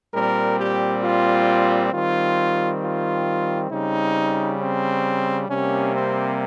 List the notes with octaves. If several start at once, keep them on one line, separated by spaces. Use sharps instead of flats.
A#2 G3 C4 A#4
G4
F4
D#3 G3 C4 F4
F4
C#3 G3 C4 D#4
C4
C3 G3 A#3 C#4
C4